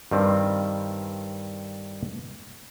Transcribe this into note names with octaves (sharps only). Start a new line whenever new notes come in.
G2 D#3 G3 C4